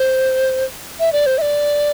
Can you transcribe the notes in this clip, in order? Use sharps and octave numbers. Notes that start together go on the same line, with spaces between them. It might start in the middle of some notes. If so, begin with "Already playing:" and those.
Already playing: C5
E5
D5
C5
E5
D5